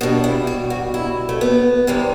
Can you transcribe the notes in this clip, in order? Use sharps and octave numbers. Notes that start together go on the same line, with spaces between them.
B2 G3 D4
E4
F#4
F#4
E4
A3
B3
C3 E3 G3